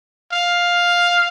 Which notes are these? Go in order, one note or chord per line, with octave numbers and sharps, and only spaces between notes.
F5